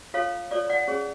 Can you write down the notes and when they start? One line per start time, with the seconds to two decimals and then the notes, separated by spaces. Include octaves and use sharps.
0.14 F4 A4 C#5 F5
0.51 F4 A4 C#5 D5
0.69 D5 F#5
0.88 C#4 G#4 C#5